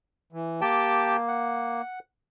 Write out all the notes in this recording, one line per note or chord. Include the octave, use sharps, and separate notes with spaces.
E3
A#3 G4 G5 A5
F#5